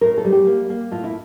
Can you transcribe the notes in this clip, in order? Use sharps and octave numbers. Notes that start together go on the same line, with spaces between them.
A2 A#4
A4
G3
G4
A#3
A#3
A2 F4
E4